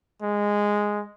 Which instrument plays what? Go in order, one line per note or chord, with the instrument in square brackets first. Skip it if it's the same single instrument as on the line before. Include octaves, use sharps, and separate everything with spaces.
[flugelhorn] G#3